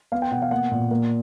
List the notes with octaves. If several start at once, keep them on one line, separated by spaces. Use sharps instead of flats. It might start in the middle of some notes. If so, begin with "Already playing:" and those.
B3 F5
G5
B2 F#5
F5
A#3 F#5
A#2
A#3